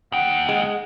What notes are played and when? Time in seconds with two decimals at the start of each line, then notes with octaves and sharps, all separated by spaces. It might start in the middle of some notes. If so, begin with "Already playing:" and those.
0.12 D#2 F#5 G5
0.49 G#3